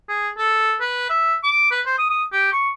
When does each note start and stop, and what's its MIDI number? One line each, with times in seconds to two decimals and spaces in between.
0.09 0.29 68
0.37 0.76 69
0.81 1.08 71
1.10 1.35 76
1.44 1.67 86
1.71 1.81 71
1.86 1.94 72
1.98 2.06 87
2.10 2.24 87
2.32 2.52 67
2.52 2.70 85